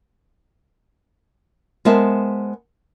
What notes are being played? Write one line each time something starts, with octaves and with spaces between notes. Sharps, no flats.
G#3 B3 A#4 C5 E5 A5